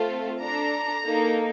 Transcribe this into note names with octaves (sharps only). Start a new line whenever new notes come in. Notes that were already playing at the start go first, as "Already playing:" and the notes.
Already playing: A3 C4 F4 A4
D4 A4 A#5
A#3 D#4 A4